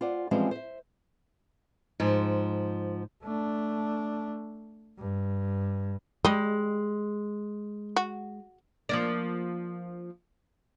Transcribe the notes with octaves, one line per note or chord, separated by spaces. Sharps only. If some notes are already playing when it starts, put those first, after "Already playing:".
F4 C5 D5 F#5 G#5
E3 F3 G3 G#3 C4 C#4
C5 E5
G#2 F3
A3 D4
G2
G3 G#3 D#5
F#4
F3 A#3 D4